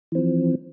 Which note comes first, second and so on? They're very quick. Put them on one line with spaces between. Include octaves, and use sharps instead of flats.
E3 C4 F3